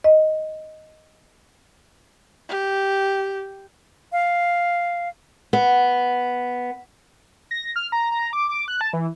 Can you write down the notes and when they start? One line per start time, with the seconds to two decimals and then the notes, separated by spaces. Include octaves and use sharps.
0.04 D#5
2.49 G4
4.12 F5
5.53 B3
7.51 A#6
7.76 F6
7.92 A#5
8.12 A#5
8.33 D6
8.49 D6
8.68 F#6
8.81 A5
8.93 E3